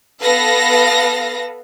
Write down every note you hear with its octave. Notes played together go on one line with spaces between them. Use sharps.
B3 A4 B4 F5 A#6